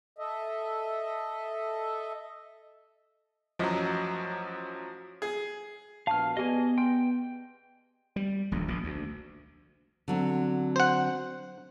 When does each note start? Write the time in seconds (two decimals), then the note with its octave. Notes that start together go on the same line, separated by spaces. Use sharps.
0.18 A4 D#5 E5
3.59 A1 F#2 F3 F#3 D#5
5.22 G#4
6.07 A#1 B2 F5 A5 C#6 F6
6.37 B3 G4 G#4 D5 D#5 G#5
6.78 G5 C6
8.16 G3
8.51 D#1 A#1 F2
8.68 A#1 A#2
8.84 D2
10.08 D3 F#3 C4
10.76 C5 F#5